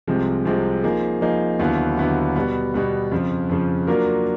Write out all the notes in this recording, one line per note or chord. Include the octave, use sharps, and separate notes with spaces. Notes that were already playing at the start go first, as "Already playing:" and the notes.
C2 C3 F3 G#3 C4
C2 C3 F3 G#3 C4
F3 A#3 D#4 G#4
F3 A#3 D#4 G#4
D#2 D3 F#3 B3 E4
D#2 D3 F#3 B3 E4
B2 G3 B3
B2 G3 B3
F2 C#3 F3
F2 C#3 F3
F#3 A#3 D4 F4 A#4